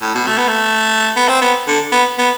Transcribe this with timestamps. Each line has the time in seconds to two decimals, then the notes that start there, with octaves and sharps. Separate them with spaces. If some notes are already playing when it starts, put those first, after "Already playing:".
0.02 A2
0.15 B2
0.27 A3
0.38 B3
0.48 A3
1.16 B3
1.29 C4
1.42 B3
1.68 D3
1.92 B3
2.18 B3